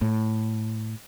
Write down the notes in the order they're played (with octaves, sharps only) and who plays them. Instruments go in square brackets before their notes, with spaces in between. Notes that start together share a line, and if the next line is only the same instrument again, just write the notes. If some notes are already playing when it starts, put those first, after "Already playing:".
[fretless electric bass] A2